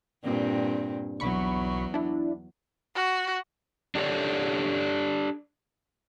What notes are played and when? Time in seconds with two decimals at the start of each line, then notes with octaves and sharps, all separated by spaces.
0.24 G2 A#2 C4
1.20 B1 E2 F#3 B5 C#6
1.94 D4 E4
2.95 F#4
3.95 D4 G4 A4 C#5 D5